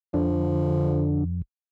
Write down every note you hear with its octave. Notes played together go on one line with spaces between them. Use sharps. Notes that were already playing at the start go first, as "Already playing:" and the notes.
F2 D3 F3